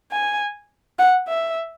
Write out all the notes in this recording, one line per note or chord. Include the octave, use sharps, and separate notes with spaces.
G#5
F#5
E5